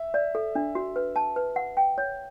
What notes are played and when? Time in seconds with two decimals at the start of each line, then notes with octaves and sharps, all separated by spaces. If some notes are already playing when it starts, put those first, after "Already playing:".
Already playing: E5
0.14 D5
0.35 A4
0.55 D4
0.75 F#4
0.96 B4
1.16 A5
1.36 B4
1.56 F#5
1.77 G5
1.98 C#5